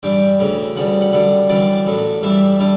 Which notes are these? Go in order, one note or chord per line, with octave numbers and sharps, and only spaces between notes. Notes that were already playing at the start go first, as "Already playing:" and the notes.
G2 E3 G3 G5
D2 C#3 E3
D2 C#3 G3 F#5
F#5
F#2 D3 G3 F#5
F#2 E3 G3 D5
A1 A2 F#3
G2 E3 G3 E5
D3 G3